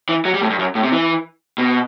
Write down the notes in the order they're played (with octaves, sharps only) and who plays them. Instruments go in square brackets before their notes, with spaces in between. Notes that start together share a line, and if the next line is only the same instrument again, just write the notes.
[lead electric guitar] E3
F#3
G3
A2
G2
F#2
A2
C3
E3
B2